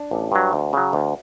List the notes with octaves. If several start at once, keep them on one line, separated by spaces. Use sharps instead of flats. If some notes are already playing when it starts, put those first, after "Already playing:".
Already playing: D4
A1
G2 F#3
D2
C#3 F#3
D2